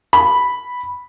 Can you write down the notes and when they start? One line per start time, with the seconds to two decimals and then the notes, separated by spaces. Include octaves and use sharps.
0.13 B5